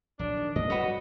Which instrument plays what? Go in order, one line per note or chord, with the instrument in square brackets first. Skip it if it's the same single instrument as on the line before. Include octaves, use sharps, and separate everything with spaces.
[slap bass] A#1 F#3 [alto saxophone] D4
[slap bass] D#3
[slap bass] G2 C#4 [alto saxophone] D#5
[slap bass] F#3 G3 [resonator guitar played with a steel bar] F#4 B4 C#5